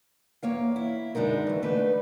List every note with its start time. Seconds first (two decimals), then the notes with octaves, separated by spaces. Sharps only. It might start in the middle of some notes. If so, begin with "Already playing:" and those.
0.43 E2 A#3 C#5 F5
0.76 E4
1.15 F#2 D3 G#3 D#4 A#4
1.47 D#2 E3
1.62 D3 A3 D#4 B4